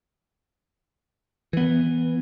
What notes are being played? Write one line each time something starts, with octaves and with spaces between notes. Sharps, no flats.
E3 B3